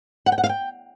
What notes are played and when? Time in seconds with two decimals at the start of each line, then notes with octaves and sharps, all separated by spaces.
0.26 F#5
0.32 G5
0.38 F#5
0.44 F5
0.49 G5